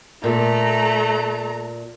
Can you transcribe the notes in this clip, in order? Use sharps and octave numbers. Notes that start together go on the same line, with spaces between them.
A#2 A3 A#5